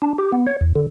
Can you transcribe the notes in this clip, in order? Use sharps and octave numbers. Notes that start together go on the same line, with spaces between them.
D4
G4
B3
C#5
E2
D3